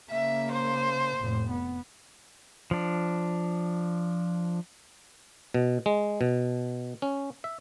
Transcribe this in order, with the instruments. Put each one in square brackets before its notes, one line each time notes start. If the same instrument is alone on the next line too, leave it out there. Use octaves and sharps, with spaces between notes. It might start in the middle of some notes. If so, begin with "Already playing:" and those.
[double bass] C#3 A#3 [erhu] E5
[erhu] C5
[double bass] F1 A2
B3
[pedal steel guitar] F3 D4
[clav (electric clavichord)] B2
G#3
B2
C#4
E5